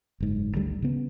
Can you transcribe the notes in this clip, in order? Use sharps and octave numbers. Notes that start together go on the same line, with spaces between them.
F#1 G#2
G#1 D2 D3 G3
C#3 B3